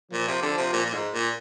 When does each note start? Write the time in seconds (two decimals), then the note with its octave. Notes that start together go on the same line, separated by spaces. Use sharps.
0.12 A#2 F3
0.28 C3
0.42 D3
0.57 C3
0.73 A#2
0.85 A#2
0.93 G#2
1.14 A#2